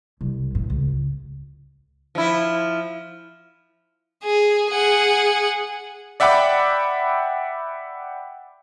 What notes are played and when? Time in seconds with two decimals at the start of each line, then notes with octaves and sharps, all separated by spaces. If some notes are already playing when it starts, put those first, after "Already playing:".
0.21 C2
0.55 A2
0.70 C#2
2.15 F3 E4
4.24 G#4
4.70 G#4 F#5
6.20 D5 E5 F#5 G5 B5 D6